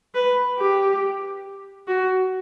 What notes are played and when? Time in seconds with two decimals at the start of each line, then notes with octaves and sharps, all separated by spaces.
0.14 B4
0.58 G4
1.88 F#4